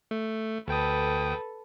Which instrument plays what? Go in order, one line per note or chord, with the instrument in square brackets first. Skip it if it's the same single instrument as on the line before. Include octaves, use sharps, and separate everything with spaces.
[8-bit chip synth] A3
[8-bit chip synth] D2 G5 D#6 [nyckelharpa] A4 B4